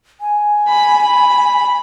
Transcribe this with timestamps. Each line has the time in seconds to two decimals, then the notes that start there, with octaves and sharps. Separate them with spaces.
0.21 G#5
0.68 B5